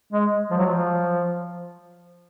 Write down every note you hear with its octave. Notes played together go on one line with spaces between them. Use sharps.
G#3
F3
F#3
F3